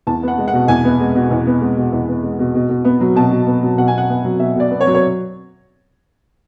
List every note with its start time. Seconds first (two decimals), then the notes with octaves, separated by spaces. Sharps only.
0.07 E2 A5
0.23 B3 F#5
0.38 G#3
0.48 F#5
0.53 B2
0.68 E2 G#5
0.84 B3
1.00 G#3
1.15 B2
1.31 E2
1.46 B3
1.61 G#3
1.77 B2
1.92 E2
2.08 B3
2.23 G#3
2.39 B2
2.55 B2
2.69 B2
2.85 B3
3.00 F#3
3.16 B2 A5
3.31 B2
3.47 B3
3.63 F#3
3.78 B2 F#5
3.88 G#5
3.93 B2 F#5
4.09 B3
4.24 F#3
4.39 B2 E5
4.56 B2 D5
4.71 B3
4.81 C#5
4.87 F#3
4.94 C#5